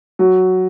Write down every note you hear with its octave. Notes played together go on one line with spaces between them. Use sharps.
F#3